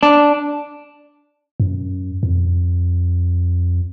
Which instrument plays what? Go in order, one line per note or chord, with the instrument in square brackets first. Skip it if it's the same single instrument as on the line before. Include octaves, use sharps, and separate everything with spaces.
[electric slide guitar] D4
[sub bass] F#2
F2